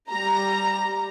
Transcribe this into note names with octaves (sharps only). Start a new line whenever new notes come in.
G3 A#5